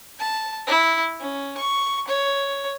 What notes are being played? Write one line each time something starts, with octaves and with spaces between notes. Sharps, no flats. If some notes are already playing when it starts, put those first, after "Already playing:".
A5
E4
C#4
C#6
C#5